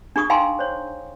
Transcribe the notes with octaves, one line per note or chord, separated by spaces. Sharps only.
D4 G#4 C#6 D#6
D#4 F5 G5 G#5 A#5 C6
C5 C#5